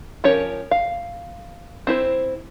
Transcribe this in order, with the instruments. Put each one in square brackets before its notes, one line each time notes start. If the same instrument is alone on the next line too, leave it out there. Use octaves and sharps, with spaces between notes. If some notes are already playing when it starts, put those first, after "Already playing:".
[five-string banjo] F3 C#4 G4 A#4 C#5
F5
C4 E4 C5